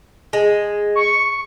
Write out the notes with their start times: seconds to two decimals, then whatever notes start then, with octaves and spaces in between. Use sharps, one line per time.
0.33 G#3
0.95 C#6